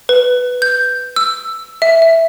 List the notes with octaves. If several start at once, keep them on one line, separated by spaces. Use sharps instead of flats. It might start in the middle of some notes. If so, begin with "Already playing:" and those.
B4
G6
E6
E5
E5